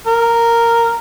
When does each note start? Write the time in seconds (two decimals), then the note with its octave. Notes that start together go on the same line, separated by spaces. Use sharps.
0.07 A#4